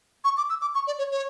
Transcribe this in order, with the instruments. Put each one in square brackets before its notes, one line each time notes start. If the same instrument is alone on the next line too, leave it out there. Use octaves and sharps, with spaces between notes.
[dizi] C#6
D6
E6
D6
C#6
D5
C#5
C#5